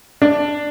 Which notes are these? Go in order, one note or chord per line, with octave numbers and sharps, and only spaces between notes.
D4